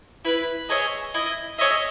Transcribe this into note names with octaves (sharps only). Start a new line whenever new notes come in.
E4 B4
G#4 C#5 D#5 E5
E4 D#5
G#4 C#5 D#5 E5